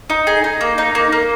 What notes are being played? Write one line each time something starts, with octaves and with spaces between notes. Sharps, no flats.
D#4
G#4
D#4
A#3
D#4
A#3
A#3